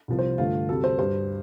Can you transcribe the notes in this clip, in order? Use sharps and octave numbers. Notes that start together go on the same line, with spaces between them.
C2 C3 F3
C5
G2 D3 A3 F4
D2 C3 G3 A4
C5
G2 G3 C5